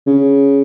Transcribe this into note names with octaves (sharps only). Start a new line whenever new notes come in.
C#3